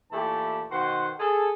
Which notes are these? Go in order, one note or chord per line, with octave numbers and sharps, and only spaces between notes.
A#2 E3 A3 E4 G4 A5
B2 D#3 F#4 C5 F#5 C6
G#4 A4